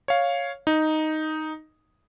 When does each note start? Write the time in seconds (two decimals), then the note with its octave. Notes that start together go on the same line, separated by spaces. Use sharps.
0.08 C#5 F5
0.67 D#4